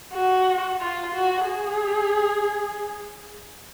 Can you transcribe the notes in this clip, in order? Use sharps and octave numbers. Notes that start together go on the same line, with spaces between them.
F#4
F4
F#4
G#4